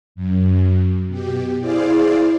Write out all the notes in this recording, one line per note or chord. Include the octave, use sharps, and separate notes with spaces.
F#2
B2 G4
E4 G#4 C5 D5 F5